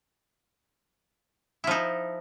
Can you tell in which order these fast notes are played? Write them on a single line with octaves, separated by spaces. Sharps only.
E4 F3 D#4